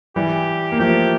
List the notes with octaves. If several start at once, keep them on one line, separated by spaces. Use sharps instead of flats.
E3 G3 G4
A#3
F3 A3 G4